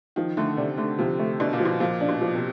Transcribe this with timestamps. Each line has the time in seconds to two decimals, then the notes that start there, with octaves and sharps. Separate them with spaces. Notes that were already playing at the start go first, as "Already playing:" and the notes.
0.16 D#3 F3
0.37 D3 A3
0.57 C3 D4
0.78 D3 A3
0.98 C3 F3
1.19 A3
1.40 B2 D4
1.53 A#2
1.60 F3
1.65 B2
1.80 A#2 F3
2.01 D4
2.08 B2
2.21 F3
2.35 C3